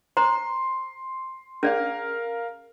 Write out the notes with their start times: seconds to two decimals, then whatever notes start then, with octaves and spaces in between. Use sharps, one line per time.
0.17 C5 A#5 C6
1.63 C#4 G#4 A#4 D5 F5